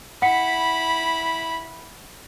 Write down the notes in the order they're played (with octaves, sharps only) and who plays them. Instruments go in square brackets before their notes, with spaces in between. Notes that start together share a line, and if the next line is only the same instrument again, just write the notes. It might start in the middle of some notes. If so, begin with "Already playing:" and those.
[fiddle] E4 B5 [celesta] F#5 B6 C#7